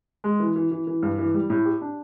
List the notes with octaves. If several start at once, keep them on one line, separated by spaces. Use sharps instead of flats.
G#3
E3
E3
E3
E3
G2
E3
G3
A2
G4
D4